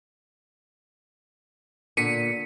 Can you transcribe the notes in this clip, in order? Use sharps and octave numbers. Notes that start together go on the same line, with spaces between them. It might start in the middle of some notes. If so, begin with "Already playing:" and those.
A#2 D3 B6 C#7 D#7